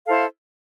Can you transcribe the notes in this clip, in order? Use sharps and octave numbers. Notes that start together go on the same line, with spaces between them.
E4 A4 C5 F5